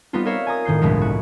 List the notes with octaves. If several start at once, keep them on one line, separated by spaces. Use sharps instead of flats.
G3 B3 C4 D#4 F4
F4 A#4 C#5 E5 F5
G#5 A#5 D#6
A2 D#3 G6 C7
G1 C2 A2 F3 G#3 B3
F#4